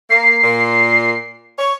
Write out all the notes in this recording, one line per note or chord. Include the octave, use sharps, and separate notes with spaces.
A#3 C7
A#2
C#5